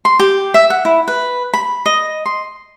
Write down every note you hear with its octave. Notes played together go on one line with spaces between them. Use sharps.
C6
G4
E5
F#5
E4
B4
B5
D#5
C6